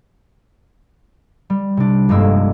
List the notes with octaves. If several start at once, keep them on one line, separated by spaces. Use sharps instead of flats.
G3
C3 D4
F1 G2 G#3 A#3 E6